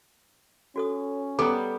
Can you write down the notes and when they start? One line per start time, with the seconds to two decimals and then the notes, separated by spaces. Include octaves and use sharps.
0.76 C#4 F#4 A4 D#6
1.39 G3 B3 A4 A#5 D6